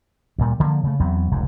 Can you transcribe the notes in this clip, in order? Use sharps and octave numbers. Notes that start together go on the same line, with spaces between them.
D2 A#2 G3
D3 F3 A3 A#3
C#3 A3
E2 F#3 B3 C4
F1 C#2 G#2